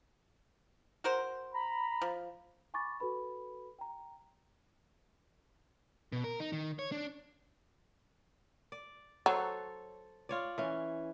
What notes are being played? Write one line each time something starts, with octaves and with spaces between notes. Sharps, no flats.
F#4 A#4 C5
A#5 B5
F3
G#5 B5 C#6 D6 A6
F#4 A4 B4 B5
G5 A#5
B2
A#4
D#4
D#3
C#5
D4
D5
F#3 A4 C5 C#5
F4 C#5 D5
E3 C#4